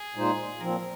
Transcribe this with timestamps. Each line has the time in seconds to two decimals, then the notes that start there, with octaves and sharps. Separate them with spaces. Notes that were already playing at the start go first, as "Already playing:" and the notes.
Already playing: G#4
0.15 A#2 G#3 D#4 C5
0.60 A#2 F3 C4 A#4